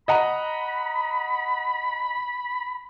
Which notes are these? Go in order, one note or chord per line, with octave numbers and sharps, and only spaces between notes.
D#5 F#5 A#5 B5